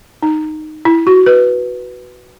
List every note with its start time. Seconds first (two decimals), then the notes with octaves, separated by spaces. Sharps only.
0.23 D#4
0.85 E4
1.07 F#4
1.26 B4